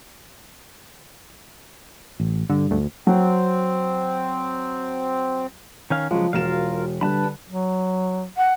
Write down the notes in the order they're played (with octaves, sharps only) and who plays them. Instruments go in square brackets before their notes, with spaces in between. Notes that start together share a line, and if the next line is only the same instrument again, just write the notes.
[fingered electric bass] A1
[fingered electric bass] G2 [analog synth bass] D3
[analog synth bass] D2
[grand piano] F#3 [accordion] C4
[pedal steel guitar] D#3 C#4 F5
[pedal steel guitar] C#3 F#3 G#3 [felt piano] F3
[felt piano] E1 F#4 E7 [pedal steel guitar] F4 A#4 F5
[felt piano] D3 G3 [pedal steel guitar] B4 A5 B5
[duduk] F#3
[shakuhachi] F#5